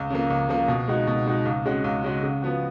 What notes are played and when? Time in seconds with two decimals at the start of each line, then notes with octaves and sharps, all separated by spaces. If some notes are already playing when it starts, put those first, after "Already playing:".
Already playing: C#2
0.10 C#3 F3 A#3
0.30 C#2
0.49 C#3 F3 A#3
0.68 B2
0.88 G#3 D#4 F#4
1.07 B2
1.26 G#3 D#4 F#4
1.45 C#2
1.65 C#3 G#3 C#4 F#4
1.84 C#2
2.04 C#3 G#3 C#4 F#4
2.23 C#3
2.42 F3 B3 F#4